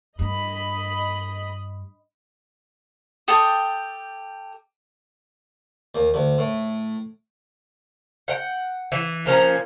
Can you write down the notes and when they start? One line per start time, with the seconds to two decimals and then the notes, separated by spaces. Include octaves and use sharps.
0.19 G2 D#5 B5
3.28 G4 A4 G5 D#6
5.95 D#2
6.14 D2
6.38 A2
8.28 F#5 G5
8.92 E3
9.25 A#2 F3 C#4 A#5